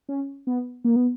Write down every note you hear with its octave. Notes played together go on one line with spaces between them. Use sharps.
C#4
B3
A#3
B3